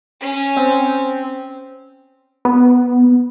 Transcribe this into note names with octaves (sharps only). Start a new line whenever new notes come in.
C#4
C4
B3